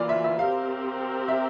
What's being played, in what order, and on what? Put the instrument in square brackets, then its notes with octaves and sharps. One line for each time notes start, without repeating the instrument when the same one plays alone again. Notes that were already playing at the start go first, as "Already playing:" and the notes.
Already playing: [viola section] E3 A#3 F4 [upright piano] D5
[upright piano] E5
E5
[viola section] C4 G4 A#4 [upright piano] F5
[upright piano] E5